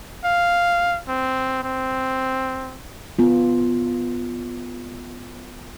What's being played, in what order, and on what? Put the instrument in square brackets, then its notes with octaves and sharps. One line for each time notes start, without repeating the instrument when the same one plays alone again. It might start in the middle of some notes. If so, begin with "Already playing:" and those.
[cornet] F5
C4
C4
[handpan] B3 F4